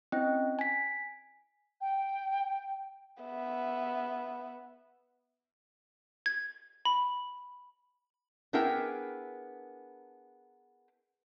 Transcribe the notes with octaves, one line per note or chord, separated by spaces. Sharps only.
C4 C#4 E4 D#5 G5
G#5 B6
G5
B3 E5
G#6
B5
B3 D4 E4 G#4 A#4 G5